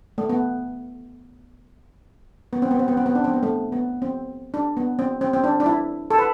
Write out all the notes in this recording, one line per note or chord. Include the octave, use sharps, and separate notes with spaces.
A3
B3
B3
C4
B3
C4
B3
C4
B3
D4
C4
B3
A3
B3
C4
D4
B3
C4
C4
C4
D4
D4
E4
A4
B4